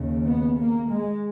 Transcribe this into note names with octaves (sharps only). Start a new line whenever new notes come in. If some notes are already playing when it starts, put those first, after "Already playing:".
Already playing: D#2 C#3
B3
A#3
G#3